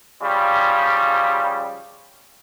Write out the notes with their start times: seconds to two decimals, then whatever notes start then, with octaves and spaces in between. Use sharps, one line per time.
0.21 C#3 F3 G3